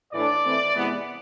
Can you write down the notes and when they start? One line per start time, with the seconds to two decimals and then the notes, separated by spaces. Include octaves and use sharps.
0.13 A2 E3 A3 D4 D5
0.45 E3 A3 C4
0.76 C3 E3 G#3 B3